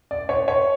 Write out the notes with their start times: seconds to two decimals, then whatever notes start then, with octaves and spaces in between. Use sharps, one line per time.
0.11 D5
0.29 C#5
0.48 C#5